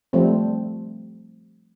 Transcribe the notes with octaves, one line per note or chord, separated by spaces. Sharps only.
F3 G3 A3 C4